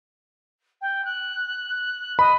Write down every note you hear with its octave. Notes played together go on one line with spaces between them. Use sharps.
G5
F#6
D#5 B5